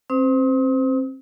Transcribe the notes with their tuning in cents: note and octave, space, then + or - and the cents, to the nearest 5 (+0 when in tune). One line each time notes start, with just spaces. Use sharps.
C4 +30 C5 -30 D#6 +40